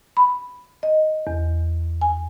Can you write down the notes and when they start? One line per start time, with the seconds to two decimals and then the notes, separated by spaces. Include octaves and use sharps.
0.17 B5
0.83 D#5
1.27 E2
2.01 G#5